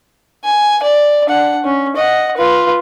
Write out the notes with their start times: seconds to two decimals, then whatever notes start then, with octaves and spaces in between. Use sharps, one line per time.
0.44 G#5
0.82 D5
1.26 D4 F#5
1.64 C#4
1.96 D#5 F#5
2.37 F4 B4